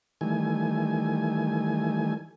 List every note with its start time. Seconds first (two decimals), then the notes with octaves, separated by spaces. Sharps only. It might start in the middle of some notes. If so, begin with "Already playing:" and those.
0.21 D#3 E3 G3 A3 G#5